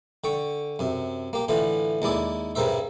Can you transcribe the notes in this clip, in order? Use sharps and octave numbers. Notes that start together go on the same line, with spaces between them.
D3 G5 C#6
F#2 C3
A#3 G4
A2 D3 E3 F4
D#2 G#3 E4 D5 G#5
G2 C#3 G3 A#4 C5 E5